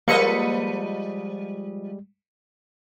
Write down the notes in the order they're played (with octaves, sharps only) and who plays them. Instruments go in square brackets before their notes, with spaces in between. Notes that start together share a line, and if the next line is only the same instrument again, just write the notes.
[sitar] F3 B4 D#5 [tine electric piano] G3 G#3 [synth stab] A#3 C#7